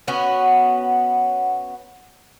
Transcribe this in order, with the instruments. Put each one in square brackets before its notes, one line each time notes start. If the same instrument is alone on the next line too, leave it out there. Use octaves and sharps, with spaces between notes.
[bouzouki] B3 C#4 F#4